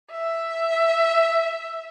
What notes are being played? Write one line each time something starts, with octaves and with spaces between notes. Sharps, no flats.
E5